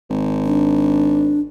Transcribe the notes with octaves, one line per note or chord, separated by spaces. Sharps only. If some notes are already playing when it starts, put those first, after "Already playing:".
G#1
D4